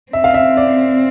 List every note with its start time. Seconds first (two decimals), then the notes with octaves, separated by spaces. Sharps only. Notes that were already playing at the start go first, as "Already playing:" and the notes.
0.12 C4 E5
0.24 F5
0.34 E5
0.57 D5